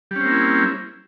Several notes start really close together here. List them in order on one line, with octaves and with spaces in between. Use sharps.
G3 C#4 C4 A#3 E4